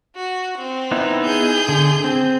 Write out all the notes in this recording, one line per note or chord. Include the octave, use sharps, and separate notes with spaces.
F#4
C4
B3 D#4 E4
G#4 G6
D3
C4